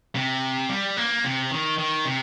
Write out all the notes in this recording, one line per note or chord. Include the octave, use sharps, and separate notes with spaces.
C3
G3
A#3
C3
D#3
D#3
C3